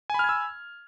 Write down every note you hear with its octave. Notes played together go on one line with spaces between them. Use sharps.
G#5 B5 E6 F6 G#6